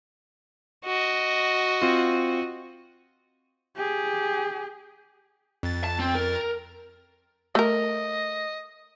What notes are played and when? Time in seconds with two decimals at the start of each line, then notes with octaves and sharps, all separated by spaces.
0.86 F#4 D#5
1.82 C4 F4
3.76 G4 G#4
5.63 F2 A6
5.84 A5
5.99 C4
6.15 A#4
7.55 A3 A#4 D#5